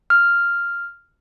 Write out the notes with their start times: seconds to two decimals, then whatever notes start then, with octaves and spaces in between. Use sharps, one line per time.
0.10 F6